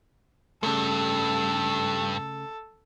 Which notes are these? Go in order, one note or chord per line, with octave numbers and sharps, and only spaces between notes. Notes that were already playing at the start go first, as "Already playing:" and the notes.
G2 C#3 A3 A4